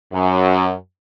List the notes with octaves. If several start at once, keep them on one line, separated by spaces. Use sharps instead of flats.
F#2